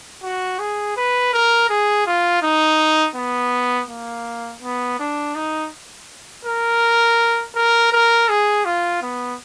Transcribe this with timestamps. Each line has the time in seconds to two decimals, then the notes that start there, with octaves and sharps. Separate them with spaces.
0.23 F#4
0.59 G#4
0.97 B4
1.33 A#4
1.70 G#4
2.06 F4
2.42 D#4
3.16 B3
3.89 A#3
4.62 B3
4.99 D4
5.35 D#4
6.45 A#4
7.56 A#4
7.92 A#4
8.29 G#4
8.65 F4
9.02 B3